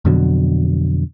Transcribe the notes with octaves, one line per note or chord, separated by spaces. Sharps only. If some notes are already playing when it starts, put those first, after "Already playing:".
F2 B2 D3 F#3